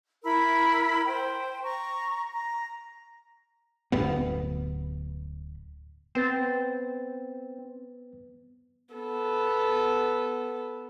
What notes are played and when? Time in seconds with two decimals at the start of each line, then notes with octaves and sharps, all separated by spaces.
0.24 E4 A#4 B5 E6
1.05 C5 G5
1.63 A#5 C#6
2.32 A#5
3.92 D1 D2 G2 B3
6.15 B3 C4 B4 A6
8.94 B3 A4